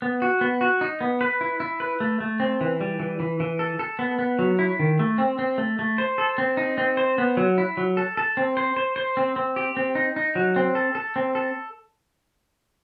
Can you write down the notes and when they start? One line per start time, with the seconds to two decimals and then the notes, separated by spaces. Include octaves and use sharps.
0.02 B3
0.22 F#4
0.41 B3
0.61 F#4
0.81 D#4
1.01 B3
1.21 B4
1.41 E4
1.60 E4
1.80 B4
2.00 A3
2.20 A3
2.40 C4
2.61 E3
2.81 G3
3.00 E3
3.20 E3
3.40 E3
3.59 A4
3.79 A4
3.99 B3
4.19 B3
4.39 F#3
4.59 E4
4.79 D#3
4.99 A3
5.18 C4
5.39 C4
5.58 A3
5.79 A3
5.98 C5
6.18 A4
6.38 C4
6.57 D#4
6.78 C4
6.97 C5
7.18 B3
7.37 F#3
7.58 E4
7.77 F#3
7.97 A4
8.17 A4
8.37 C4
8.57 C5
8.77 C5
8.96 C5
9.17 C4
9.36 C4
9.56 G4
9.77 C4
9.95 D#4
10.16 D#4
10.35 F#3
10.56 C4
10.75 A4
10.95 A4
11.16 C4
11.35 A4